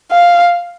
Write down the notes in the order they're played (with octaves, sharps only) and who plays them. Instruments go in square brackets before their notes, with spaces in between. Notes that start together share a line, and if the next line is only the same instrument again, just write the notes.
[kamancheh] F5